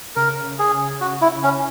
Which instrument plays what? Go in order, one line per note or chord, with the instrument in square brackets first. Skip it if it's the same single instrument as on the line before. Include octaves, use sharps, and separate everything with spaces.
[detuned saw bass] C#3 [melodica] A#4
[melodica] G#4
F#4
E4
C#4